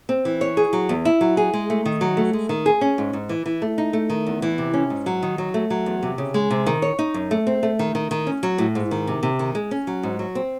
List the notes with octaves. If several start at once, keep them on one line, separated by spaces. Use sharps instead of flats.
C4
E3
C#5
G#4
F#3
E2
E4
F#3
G#4
G#3
A3
D#3
F#3
A3
G#3
D#3
G#4
C#4
G#2
G#2
E3
E3
A3
D#4
A3
D#3
E2
E3
C3
C#4
G#2
F#3
D#3
F#3
A3
F#3
E2
C3
C#3
G#3
C3
D#3
C#5
D#4
F#2
A3
C4
A3
D#3
D#3
D#3
C#4
F#3
A2
G#2
D#3
C3
C3
D#3
G#3
C#4
F#3
G#2
F#3
C4